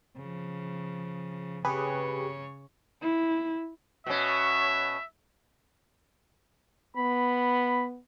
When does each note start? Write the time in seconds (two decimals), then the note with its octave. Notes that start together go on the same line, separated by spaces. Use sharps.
0.17 C#3 F3
1.65 C#3 G4 G#4 B4 C#5
3.01 E4
4.06 B2 C#4 E5
6.96 B3 B5